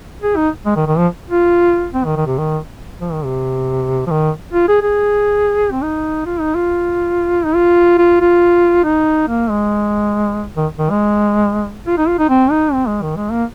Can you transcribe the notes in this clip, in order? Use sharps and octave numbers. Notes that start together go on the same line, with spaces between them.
G#4
D#4
G#3
D#3
D#3
F3
F4
C4
D#3
D#3
C3
D#3
F3
D#3
C3
F3
D#3
F4
G#4
G#4
C4
D#4
F4
D#4
F4
D#4
F4
F4
F4
D#4
A#3
G#3
D#3
D#3
G#3
F4
D#4
F4
D#4
C4
D#4
C4
G#3
D#3
G#3
A#3